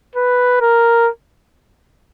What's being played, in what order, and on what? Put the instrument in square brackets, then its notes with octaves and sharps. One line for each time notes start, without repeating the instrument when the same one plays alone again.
[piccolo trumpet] B4
A#4